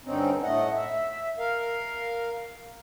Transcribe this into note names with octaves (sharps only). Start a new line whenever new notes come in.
G2 D3 C4 C#4 D#4
A2 A3 D#5 F#5
E5
A#4 F5